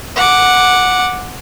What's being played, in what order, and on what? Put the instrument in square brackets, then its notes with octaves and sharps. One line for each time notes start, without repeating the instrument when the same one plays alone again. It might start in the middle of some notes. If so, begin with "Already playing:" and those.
[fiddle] F#5 D6